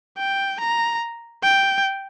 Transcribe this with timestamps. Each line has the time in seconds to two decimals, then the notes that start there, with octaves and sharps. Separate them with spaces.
0.17 G5
0.60 A#5
1.43 G5